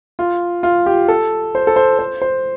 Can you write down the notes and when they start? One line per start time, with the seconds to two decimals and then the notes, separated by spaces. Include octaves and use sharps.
0.19 F4
0.63 F4
0.86 G4
1.08 A4
1.55 C5
1.67 A4
1.76 C5
1.99 C5
2.22 C5